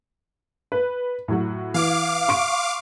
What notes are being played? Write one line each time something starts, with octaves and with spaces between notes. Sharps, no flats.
B4
A2 F#3 F#4
E3 F5 D6
C6 C#6 D7